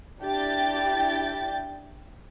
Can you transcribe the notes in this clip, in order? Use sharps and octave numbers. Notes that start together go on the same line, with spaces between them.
D4 E4 G4 G5 A6